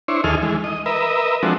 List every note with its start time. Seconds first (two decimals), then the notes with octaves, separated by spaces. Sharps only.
0.08 D4 E4 C5 C#5
0.24 D#2 E3 G#4 A4 D#5 F6
0.43 E3 G#3
0.64 D#5
0.86 A#4 B4 D#5 E5
1.43 F3 G#3 C4 D4 F#4 A4